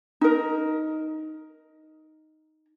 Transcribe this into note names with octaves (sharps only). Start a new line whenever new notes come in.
D#4 A#4